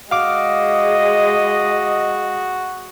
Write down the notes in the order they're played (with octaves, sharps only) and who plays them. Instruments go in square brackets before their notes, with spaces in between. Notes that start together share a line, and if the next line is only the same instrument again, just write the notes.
[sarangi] G#3 [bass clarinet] F#4 [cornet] D#5 [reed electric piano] F5 D6